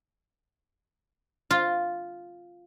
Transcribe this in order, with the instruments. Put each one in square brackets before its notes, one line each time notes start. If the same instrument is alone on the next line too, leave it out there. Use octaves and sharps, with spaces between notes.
[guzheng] F4